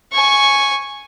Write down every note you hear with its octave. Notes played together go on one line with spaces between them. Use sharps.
G#5 C#6